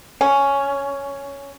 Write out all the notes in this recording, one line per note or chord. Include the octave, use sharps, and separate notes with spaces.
C#4